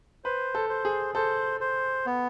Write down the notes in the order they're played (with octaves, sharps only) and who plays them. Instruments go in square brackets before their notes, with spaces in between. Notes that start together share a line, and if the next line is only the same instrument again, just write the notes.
[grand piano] B4 [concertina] C5
[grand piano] A4
[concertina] C5
[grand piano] G#4
[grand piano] A4 [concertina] C5
[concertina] C5
B3